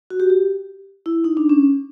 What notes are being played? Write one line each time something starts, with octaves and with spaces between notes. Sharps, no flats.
F#4
G4
G4
E4
D#4
D4
C#4